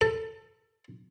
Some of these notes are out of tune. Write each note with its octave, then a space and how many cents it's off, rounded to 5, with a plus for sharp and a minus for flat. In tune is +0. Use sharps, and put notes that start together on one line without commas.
A4 +25